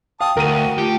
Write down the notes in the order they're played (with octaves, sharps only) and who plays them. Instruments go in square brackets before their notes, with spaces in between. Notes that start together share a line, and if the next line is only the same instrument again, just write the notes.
[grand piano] F5 [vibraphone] G5 [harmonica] A5 D#6
[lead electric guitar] D2 [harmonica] F#4 [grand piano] A#4 D#7
[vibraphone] A3 F4 [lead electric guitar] G4